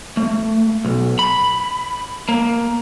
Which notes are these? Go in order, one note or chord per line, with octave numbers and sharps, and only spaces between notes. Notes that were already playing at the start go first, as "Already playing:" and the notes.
A3
B1
B5
A#3